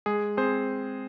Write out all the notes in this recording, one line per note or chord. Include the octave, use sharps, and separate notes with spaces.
G#3 G#4
C4 G#4 C5